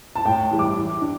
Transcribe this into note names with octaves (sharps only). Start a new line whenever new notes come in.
A5
A2 G5
E3 G3
D6
E3
D4